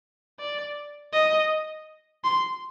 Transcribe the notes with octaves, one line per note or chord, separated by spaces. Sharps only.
D5
D#5
C6